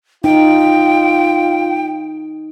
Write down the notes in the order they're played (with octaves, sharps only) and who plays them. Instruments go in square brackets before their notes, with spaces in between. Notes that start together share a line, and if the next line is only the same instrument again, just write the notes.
[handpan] D#4 [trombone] F4 [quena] G5